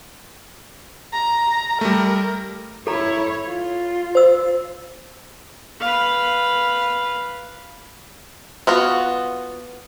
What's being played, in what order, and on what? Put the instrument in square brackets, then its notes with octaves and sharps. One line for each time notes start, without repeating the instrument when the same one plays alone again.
[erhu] A#5
[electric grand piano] G3 A3 [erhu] A#4
[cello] E4 C#5 [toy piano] A4 A#5
[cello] F4
[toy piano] C5 E6
[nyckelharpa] B4 F5
[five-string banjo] B3 F4 F#4